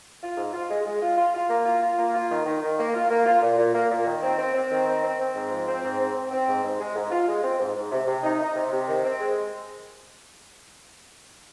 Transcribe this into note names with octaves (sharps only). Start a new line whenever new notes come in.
F4
G#2
F4
G#3
G#3
F4
F4
F4
A#3
F4
F4
A#3
F4
D#3
D#3
D#3
A#3
F4
A#3
F4
A#2
A#2
A#3
A#2
D#3
C4
C4
C4
D#3
C4
C4
C4
G#2
F3
C4
G#2
C4
C4
C4
G#2
G#2
G#3
G#2
F4
G#3
C4
G#2
G#2
C3
C3
D#4
D#4
C3
C3
D#3
C4
G#3